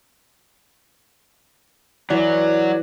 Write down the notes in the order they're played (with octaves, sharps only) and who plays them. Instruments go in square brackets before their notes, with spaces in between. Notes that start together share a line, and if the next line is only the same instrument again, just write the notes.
[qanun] E3 [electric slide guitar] F#3 [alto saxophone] D5